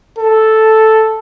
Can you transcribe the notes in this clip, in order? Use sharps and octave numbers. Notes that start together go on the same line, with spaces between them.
A4